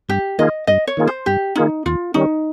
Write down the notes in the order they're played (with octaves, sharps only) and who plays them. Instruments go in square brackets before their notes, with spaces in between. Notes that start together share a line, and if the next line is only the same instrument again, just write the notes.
[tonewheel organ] G2 [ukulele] G4
[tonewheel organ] D#3 A#3 F4 G#4 [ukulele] D#5
[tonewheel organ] G2 [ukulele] D#5
[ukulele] C#5
[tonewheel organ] D#3 A#3 F4 G#4
[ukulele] C5
[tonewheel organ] G2 [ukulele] G4
[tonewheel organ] D#3 A#3 F4 G#4 [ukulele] D#4
[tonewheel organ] D#2 [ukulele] F4
[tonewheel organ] D#3 G3 C#4 [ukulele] D#4